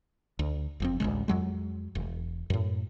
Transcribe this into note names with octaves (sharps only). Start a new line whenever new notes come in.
D2
F#1 F2 C4
A1 D2 C#3 G#3
F2 F#3 G#3
E1
F#2 A2